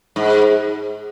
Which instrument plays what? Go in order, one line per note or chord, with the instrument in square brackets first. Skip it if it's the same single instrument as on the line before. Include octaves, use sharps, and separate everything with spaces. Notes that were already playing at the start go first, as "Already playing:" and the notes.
[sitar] G#2